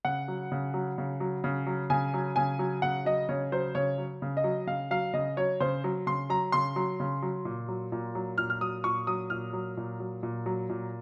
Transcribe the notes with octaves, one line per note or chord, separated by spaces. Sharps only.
C#3 F#5
F#3
C#3
F#3
C#3
F#3
C#3
F#3
C#3 G#5
F#3
C#3 G#5
F#3
C#3 F#5
F#3 D#5
C#3 C#5
F#3 C5
C#3 C#5
F#3
C#3
D#5
F#3
C#3 F5
F#3 F5
C#3 D#5
F#3 C#5
C#3 C5
F#3
C#3 C6
F#3 A#5
C#3 C6
F#3
C#3
F#3
A#2
F#3
A#2
F#3
A#2 F6
F6
F#3 D#6
A#2 C#6
F#3 D#6
A#2 F6
F#3
A#2
F#3
A#2
F#3
A#2